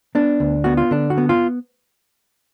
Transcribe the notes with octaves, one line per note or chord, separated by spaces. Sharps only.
B3 D4
D2
B3 F#4
F4
D3 D4
F#4
B3
F4